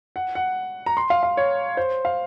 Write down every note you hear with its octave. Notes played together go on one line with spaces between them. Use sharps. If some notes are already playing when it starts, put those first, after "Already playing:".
F#5
F#5
A#5
C6
F5
F5
C#5
C5
F5